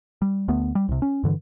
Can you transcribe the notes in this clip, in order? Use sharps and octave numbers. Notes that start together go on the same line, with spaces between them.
G3
D2 A3 B3
G3
C2 C3
C#4
G2 D3 E3